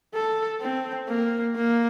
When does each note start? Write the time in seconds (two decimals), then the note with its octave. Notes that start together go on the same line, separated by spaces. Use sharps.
0.14 A4
0.61 C4
1.09 A#3
1.56 A#3